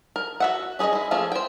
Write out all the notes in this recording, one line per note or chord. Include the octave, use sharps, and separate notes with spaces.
A#4
F#4 E5 F#5
C#4 G#4 C5 C#5 D#5
G#3 E4
F3 A3 A#3 C#4 G#4
C5 G5